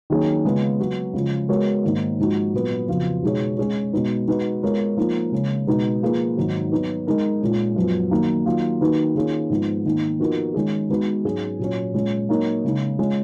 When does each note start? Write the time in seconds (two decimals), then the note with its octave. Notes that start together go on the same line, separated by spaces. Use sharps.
0.10 D#3 F#3 A#3 C#4 G#4
0.45 C#3 G#3 B3 F4
0.80 F#3 B3 F#4
1.14 C#3 F3 G#3
1.49 G#3 B3 F#4 A#4 C#5
1.84 G#2 D#3 A#3
2.19 G#2 F3 G#3 D#4 F#4
2.53 A#2 F#3 B3
2.88 F2 C#3 F#3 B3 F4
3.23 B2 G#3 D#4 G#4 C#5
3.58 G#3 C#4 G#4 C#5
3.93 B2 G#3 B3 D#4
4.28 G#3 D#4 F#4 B4
4.63 G#3 B3 F4 A#4 C#5
4.97 F3 A#3 D#4 A#4
5.32 C#3 G#3 C#4
5.67 B2 G#3 B3 D#4
6.02 F3 A#3 F4 G#4 B4
6.37 G#2 D#3 F#3
6.72 F#3 B3 D#4 F#4
7.07 G#3 D#4 A#4
7.41 A#2 G#3 C#4
7.76 F#2 F3 B3
8.11 D#3 F#3 A#3 D#4
8.46 D#3 F#3 A#3 F4
8.81 D#3 A#3 D#4 F#4 B4
9.15 D#3 A#3 C#4 F4 G#4
9.50 G#2 F3 G#3 B3
9.85 G#2 D#3 A#3
10.20 F3 B3 D#4 F#4 A#4
10.54 D#3 G#3 C#4 G#4
10.90 G#3 B3 D#4 F#4 B4
11.24 G#2 F#3 C#4 G#4
11.59 A#2 F#3 C#4
11.94 A#2 G#3 C#4
12.29 F#3 A#3 D#4 A#4 C#5
12.64 C#3 G#3 D#4
12.99 G#3 C#4 F4 G#4